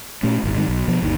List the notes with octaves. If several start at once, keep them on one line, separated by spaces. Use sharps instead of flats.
A#2 A3 C#4
D#1 G#1
G#2 D#3 G3
B1
B2 F3 B3
G1 D#2 D#3